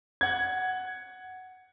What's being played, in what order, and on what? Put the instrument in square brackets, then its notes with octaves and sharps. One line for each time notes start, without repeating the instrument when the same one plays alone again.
[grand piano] F#5 G#6